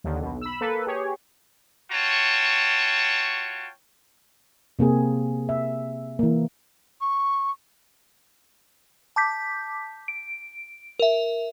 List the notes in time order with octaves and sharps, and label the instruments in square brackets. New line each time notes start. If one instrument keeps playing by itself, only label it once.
[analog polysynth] D#2 D3
B1 B2
B5 E6
A#3 A4 B4
G4 G#4 C#5
[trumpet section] F4 F#4 C#5 G5 A5
[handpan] C3 A#3 C4 G#4
E5
E3 A#3
[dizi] C#6
[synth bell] A5 D6 G6 B6
D7
A#4 E5